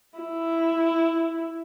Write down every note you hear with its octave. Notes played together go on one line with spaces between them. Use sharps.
E4